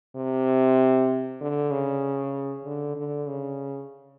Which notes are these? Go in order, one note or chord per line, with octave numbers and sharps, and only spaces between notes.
C3
D3
C#3
D3
D3
C#3